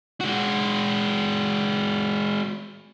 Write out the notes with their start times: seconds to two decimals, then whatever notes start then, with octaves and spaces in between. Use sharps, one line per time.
0.21 G#3 F#4